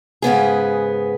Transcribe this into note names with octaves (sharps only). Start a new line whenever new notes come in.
G#2 C#3 B3 G#4